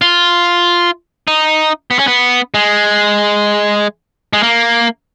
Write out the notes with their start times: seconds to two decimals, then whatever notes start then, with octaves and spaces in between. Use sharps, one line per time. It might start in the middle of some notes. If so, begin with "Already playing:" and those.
0.02 F4
1.28 D#4
1.91 B3
1.99 C#4
2.07 B3
2.54 G#3
4.33 G#3
4.43 A#3